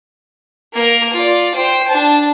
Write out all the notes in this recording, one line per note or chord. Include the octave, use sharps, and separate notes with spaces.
A#3 A#4
F4 D5
C5 G5
D4 A5